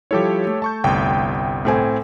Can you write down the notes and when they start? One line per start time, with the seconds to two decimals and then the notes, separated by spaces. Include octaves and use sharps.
0.11 F3 G3 E4 G4 A4 C#5
0.47 A3
0.62 A5 C#6 G6
0.84 G1 C2 G5
1.65 A2 C4 G#5